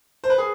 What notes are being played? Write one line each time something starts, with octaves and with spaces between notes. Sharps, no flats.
C5
B4
G#4